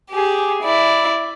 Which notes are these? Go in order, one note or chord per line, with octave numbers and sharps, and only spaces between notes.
G4 G#4
E4 D5